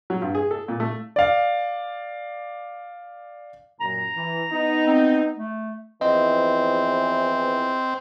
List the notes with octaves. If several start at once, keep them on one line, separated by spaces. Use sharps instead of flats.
F#3
G2
G#4
A4
A#2
A3
D5 F5
F#2 A#2 A#5
E3
B3 D#4
C4
A3
E2 E3 F3 C4 D#5